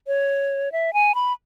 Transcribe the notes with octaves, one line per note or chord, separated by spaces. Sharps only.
C#5
E5
G#5
B5